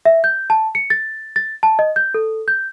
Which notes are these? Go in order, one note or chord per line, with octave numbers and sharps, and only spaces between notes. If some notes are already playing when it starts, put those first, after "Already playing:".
E5
G6
A5
C#7
A6
A6
A5
D#5
G6
A4
G6